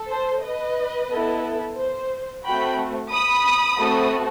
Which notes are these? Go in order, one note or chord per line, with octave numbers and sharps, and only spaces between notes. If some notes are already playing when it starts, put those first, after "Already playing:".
Already playing: A4
C5
B4 D#5
B3 E4 A4
C5
A3 C4 F#4 G5 B5
B5 D#6
A3 C4 F#4 A4